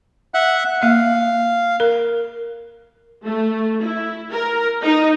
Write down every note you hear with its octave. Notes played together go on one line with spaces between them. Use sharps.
E5 F#5 F#6
A#3 E5 F5
A#4
A3
E4
A#4
D#4